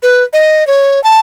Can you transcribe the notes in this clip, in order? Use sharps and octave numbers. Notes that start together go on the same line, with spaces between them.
B4
D#5
C#5
A5